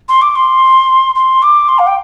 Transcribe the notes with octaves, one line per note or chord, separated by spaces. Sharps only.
C6
D6
C6
C6
D6
C6
F5
G5